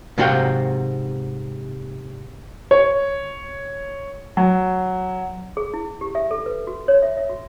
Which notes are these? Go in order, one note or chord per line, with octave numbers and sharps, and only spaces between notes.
G#2 C3 F#4 F5 G5
C#5
F#3
G#4
E4
G4
E5
A4
B4
F#4
C#5
E5
E5
F#4